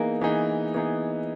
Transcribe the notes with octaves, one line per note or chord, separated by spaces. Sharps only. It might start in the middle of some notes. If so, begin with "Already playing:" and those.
Already playing: E3 A#3 B3 D#4 G#4
E3 B3 D#4 G#4
E3 B3 D#4 G#4